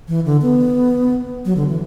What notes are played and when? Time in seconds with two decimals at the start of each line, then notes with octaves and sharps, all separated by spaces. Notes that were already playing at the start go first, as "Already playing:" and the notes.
0.08 E3
0.25 D3
0.42 B3
1.45 F#3
1.56 D3
1.68 E3